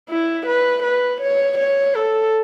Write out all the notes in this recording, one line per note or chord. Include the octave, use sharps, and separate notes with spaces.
E4
B4
B4
C#5
C#5
A4